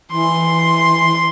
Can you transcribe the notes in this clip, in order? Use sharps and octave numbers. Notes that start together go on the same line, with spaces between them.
E3 C6